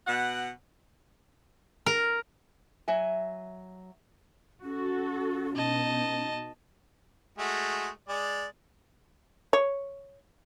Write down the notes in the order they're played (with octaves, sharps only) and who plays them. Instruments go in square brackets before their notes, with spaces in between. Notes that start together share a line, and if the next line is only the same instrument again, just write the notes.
[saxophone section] B2 F#5
[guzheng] A#4
[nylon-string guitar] F#3 E5 G#5
[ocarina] C#4 [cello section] F#4 A4
[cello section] B2 D#4 [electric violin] D#5 A5
[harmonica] G#3 A3 F#4
G#3 D5
[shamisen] C#5